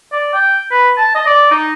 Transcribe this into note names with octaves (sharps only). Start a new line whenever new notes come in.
D5
G5
B4
A5
D#5
D5
D#4